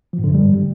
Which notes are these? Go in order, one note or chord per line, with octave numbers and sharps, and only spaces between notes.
F3
G#2
D3
F#2
G3